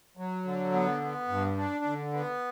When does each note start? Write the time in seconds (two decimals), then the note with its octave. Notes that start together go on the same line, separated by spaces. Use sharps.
0.17 F#3
0.45 D3
0.73 B3
1.02 B3
1.28 G2
1.57 D4
1.85 D3
2.13 B3